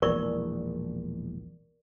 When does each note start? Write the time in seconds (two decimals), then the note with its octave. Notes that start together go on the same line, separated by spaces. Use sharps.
0.02 E1 A#1 E2 A#4 D5 C#6